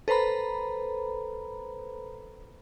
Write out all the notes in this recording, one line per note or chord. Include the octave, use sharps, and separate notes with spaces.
A4 B4 C5 A#5 B5